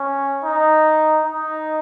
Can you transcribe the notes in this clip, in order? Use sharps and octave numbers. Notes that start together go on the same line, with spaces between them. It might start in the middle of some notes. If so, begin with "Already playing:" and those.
Already playing: C#4
D#4
D#4